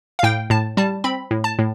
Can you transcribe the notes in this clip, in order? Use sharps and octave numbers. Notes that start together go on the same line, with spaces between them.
F5
A2 G5
A2 A5
G3 A5
C4 B5
A2
A5
A2